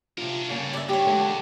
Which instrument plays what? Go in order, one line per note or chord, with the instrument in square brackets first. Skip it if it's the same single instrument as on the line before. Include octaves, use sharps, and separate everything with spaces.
[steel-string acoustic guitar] C3 F4 [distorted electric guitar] D4 A#4
[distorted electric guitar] G2 G3 [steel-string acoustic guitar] C#3 A#3 G#5
[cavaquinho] D5 E5
[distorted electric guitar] G2 [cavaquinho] G4 C#5
[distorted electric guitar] E2 [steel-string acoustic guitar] D3 G#3 D4